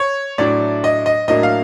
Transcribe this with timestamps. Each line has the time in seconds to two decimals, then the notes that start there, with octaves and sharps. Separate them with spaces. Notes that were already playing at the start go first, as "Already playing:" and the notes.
Already playing: C#5
0.38 A2 F#3 A3 D4 D5
0.84 D#5
1.06 D#5
1.28 A2 F#3 A#3 D4 D#5
1.43 F5